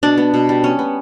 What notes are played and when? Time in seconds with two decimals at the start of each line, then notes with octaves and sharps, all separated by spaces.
0.03 B2 D4
0.18 B3
0.34 B2
0.49 G3
0.64 B3 C#4
0.79 B3